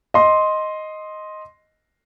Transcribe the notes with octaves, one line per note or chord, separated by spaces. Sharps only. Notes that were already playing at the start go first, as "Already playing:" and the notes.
D#5 C6